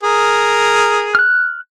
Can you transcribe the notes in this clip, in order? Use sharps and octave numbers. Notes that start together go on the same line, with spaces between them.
G#4 A#4
F6 F#6